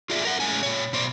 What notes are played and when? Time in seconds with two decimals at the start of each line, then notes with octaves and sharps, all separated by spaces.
0.10 F4 G#4 D5 E5
0.25 A#4 F#5
0.40 A2 G#3 C#4 G#5
0.63 A#2 C#5
0.93 B2 C5 D5